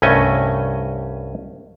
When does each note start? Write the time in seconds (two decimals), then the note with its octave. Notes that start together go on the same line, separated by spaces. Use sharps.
0.02 C2 G2 A3 C#4 D#5 G#5